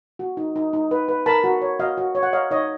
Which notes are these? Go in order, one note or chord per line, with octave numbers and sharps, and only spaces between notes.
F#4
D#4
D#4
D#4
B4
B4
A#4 A5 B5
F#4
C#5
F#4 D#5 F5
F#4
C#5
F#5
C#5 D#5 F5
D#4 C#5 D#5